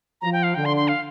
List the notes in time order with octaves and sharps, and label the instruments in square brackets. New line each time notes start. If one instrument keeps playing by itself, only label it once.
[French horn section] F3 [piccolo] A#5
[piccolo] G5
F5
[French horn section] D3 [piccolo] G5
[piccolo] C6
C6
F5